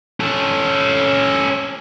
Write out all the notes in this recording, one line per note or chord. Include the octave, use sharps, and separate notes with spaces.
C#4 A4